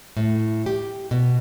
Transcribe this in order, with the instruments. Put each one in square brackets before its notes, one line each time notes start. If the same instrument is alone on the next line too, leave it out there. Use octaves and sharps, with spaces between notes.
[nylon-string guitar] A2
G4
B2